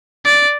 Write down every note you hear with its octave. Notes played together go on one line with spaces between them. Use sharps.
D5